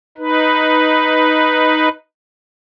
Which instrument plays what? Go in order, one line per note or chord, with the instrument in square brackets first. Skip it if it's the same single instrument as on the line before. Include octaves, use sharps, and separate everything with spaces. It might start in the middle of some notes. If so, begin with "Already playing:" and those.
[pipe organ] D#4 B4